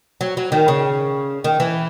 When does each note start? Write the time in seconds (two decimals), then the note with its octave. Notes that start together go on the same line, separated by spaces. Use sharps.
0.21 F#3
0.37 F#3
0.52 D#3
0.68 C#3
1.44 D#3
1.60 E3